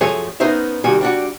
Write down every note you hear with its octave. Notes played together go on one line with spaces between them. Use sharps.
F#2 F3 A3 G#4 C#5
B3 C#4 D#4 A#4 C5 E5
C2 D#3 G3 F#4 G#5
G3 D4 F#4